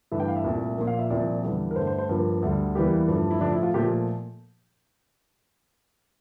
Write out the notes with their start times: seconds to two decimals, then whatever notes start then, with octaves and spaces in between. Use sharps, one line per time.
0.11 G2 E3 A3 E5
0.20 G5
0.28 F5
0.36 E5
0.44 C2 A#2 A3
0.77 A#2 F3 A#3
0.87 F5
0.99 E5
1.10 C2 A#2 F3 D5
1.44 E2 D3 G3
1.71 A#4
1.76 G2 D3 A3 C5
1.87 C5
1.98 C5
2.09 G2 F3 A#3 A#4
2.42 D2 D3 G3
2.75 E2 E3 G3 A#3 G4
3.08 G2 F3 A3
3.31 E4
3.41 A2 F3 A3 D4
3.52 E4
3.63 F4
3.74 A#2 F3 A3 G4